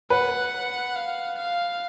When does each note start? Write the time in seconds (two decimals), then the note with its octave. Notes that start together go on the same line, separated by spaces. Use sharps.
0.10 B4 F#5
0.96 F5
1.38 F5